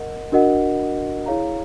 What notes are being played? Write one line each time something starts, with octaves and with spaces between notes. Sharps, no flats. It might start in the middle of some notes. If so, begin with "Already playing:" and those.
Already playing: A#4 D#5 F#5
D4 F#4 A#4 D#5 F#5
E4 G#4 C#5 F5 A#5